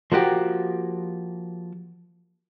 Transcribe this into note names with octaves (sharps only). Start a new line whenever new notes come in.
F3 A#3 F#4 G4